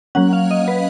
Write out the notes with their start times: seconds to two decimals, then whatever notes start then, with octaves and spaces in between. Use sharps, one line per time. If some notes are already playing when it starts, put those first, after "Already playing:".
0.15 F#3 A#3 C#4 F#5
0.33 F5
0.51 D#5
0.68 B4